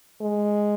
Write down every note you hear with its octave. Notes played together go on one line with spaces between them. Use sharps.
G#3